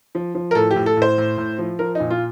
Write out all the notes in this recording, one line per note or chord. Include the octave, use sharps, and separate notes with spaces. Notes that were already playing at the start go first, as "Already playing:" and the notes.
F3
F3
A#4
A2 A4
G4
A2
A4
A2 C5
A2
A2
F3
F3 A#4
A#2 D#4
F4